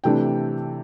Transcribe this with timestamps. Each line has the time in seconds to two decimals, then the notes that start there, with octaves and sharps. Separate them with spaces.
0.04 C3 E3 A3 D4 G5